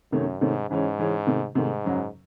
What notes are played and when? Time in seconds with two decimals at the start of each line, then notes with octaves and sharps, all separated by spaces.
0.12 F#2 C3 D#3 A3 C#4
0.41 G#2 C3 D#3 A3 C#4
0.69 G#2 C#3 E3 G#3 C#4
0.99 C#3 E3 G#3 C#4
1.27 C3 D#3 A3
1.55 G#2 C3 D#3 A3
1.84 F#2 C#3 F#3